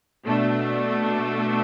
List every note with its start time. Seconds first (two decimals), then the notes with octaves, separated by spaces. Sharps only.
0.25 B2 A3 D4